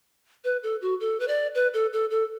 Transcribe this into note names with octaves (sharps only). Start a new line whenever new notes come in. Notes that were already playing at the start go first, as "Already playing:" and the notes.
B4
A4
F#4
A4
B4
D5
B4
A4
A4
A4